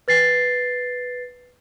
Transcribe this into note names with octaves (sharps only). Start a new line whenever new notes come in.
B4 A6 C7